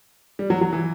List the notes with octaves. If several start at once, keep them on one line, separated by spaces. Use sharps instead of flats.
G3
F#3
F#3
E3